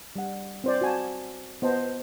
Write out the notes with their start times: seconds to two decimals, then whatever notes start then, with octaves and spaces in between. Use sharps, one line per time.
0.16 G3 F#5
0.64 C4 C5 D5
0.81 F#4 G#5 A5
1.62 B3 C5 D#5 A5